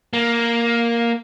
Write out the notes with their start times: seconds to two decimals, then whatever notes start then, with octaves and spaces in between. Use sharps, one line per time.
0.13 A#3